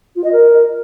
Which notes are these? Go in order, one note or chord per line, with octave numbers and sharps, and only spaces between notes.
F4
D#5
A#4